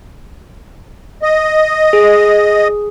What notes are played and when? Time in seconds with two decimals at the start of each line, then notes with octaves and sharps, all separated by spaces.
1.22 D#5
1.93 G#4